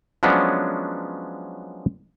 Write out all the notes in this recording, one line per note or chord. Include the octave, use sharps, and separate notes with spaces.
F3 F#3 G#3 B3 C#4 D4